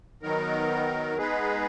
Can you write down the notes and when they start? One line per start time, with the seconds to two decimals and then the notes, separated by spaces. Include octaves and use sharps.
0.23 D#3 F#3 B3 D#4 A#4
1.18 G#3 B3 D#4 G#4 B4